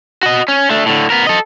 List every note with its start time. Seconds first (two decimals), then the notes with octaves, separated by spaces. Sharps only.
0.23 F#4 D#5
0.48 C#4
0.71 A3 D4
0.86 A2 D3
1.10 B3 A#4
1.27 A4 D#5